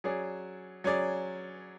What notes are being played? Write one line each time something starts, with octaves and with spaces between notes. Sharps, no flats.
F#3 C#4 G#4 D5
F#3 C#4 G#4 D5